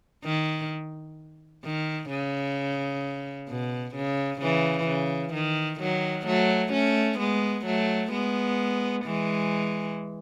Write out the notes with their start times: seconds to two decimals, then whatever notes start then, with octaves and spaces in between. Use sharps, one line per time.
0.25 D#3
1.64 D#3
2.10 C#3
3.49 B2
3.96 C#3
4.41 C#3 E3
4.87 C#3
5.34 D#3
5.80 D#3 F#3
6.27 F#3 A3
6.73 A3 C#4
7.19 G#3 B3
7.66 F#3 A3
8.12 G#3 B3
9.05 E3 G#3